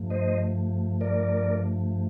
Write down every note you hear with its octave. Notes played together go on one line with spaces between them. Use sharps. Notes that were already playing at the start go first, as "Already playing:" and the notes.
Already playing: G2 F3 A3
C5 D#5
A#4 D5